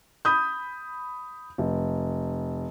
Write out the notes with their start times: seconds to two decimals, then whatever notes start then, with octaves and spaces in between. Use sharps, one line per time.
0.25 B5 D#6 G6
1.58 F1